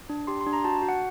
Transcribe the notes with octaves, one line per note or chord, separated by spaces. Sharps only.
D4
G4 C6
C6
D4
A#5
F#4 A5
F#4
F#5